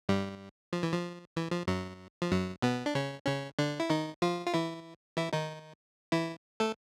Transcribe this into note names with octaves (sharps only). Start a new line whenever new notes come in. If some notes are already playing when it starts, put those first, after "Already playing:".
G2 G3
F3
E3
F3
E3
F3
F#2 F#3
F3
F#2 F#3
B2 B3
D4
C#3 C#4
C#3 C#4
D3 D4
E4
D#3 D#4
F3 F4
F4
E3 E4
E3 E4
D#3 D#4
E3 E4
A3 A4